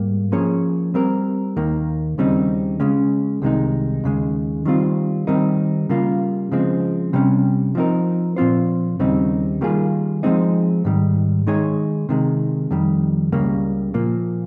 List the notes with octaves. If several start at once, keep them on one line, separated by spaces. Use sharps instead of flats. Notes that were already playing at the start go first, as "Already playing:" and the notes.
Already playing: G#2 G3 A#3
F3 A#3 C#4 G#4 C#5
G3 C4 G4 A#4
D#2 D#3 A#3
D#2 C#3 G3 C4 D#4
C#3 G#3 C#4
C2 C3 D#3 G#3 D#4
D#2 C#3 G#3
D#3 G3 C4 F4
D#3 G3 C4 D#4 A#4
C#3 G3 A#3 F4
C#3 F3 G#3 C4
C3 G3 C#4
F3 C4 D#4 A#4
A#2 F3 C4 F4 C5
D#2 C#3 G3 C4 D#4
D#3 G3 A#3 F4 G#4
F3 G#3 C4 D#4
G#2 D#3 G3
D#3 G#3 D#4 G#4 C#5
C3 D#3 G#3
F2 D#3 G3
C#2 C#3 G3 A#3
A#2 F3 A#3